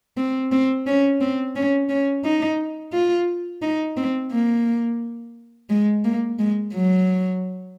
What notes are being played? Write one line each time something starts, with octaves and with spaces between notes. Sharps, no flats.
C4
C4
C#4
C4
C#4
C#4
D#4
F4
D#4
C4
A#3
G#3
A#3
G#3
F#3